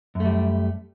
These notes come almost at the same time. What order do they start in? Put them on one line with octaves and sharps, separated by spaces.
F#2 A3 G3